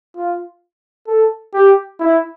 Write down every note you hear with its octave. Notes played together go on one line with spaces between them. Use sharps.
F4
A4
G4
E4